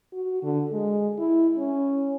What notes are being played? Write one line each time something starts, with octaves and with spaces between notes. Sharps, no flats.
F#4
D3
G#3
E4
C#4